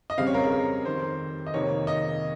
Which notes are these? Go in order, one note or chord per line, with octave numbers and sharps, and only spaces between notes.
D#5
F2 C#3 G3 C4 F5
C#5
A#4
G#4
A#4
F2 D#3 G3 C4 C5
D#5
F2 C3 D#3 A#3 C#5
D#5